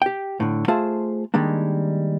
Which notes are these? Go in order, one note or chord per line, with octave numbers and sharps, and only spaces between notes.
G4 G5
A2 D3
A3 F4 G#4 C5 A5
D#3 G3 G#3 A#3 D4